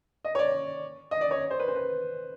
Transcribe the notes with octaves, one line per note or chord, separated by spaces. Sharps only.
D#5
C#5
D5
D#5
D5
C#5
C5
B4
C5
B4